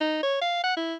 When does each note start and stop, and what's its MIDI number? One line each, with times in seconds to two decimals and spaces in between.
0.01 0.20 63
0.23 0.37 73
0.42 0.60 77
0.64 0.76 78
0.77 0.94 64